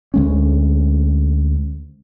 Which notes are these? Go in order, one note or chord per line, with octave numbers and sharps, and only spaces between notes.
D2 G#3 C#4